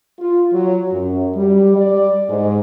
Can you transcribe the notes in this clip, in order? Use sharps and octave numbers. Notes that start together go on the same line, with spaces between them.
F4
F#3
F#2
G3
D5
G#2